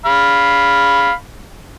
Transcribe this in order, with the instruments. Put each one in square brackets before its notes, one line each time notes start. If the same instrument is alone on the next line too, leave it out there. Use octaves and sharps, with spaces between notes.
[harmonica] F5 B5